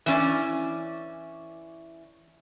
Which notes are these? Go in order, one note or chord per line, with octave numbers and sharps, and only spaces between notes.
E3 C#4 D5